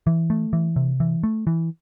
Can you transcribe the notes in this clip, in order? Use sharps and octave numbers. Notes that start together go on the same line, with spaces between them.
E3
A3
E3
C3
E3
A3
E3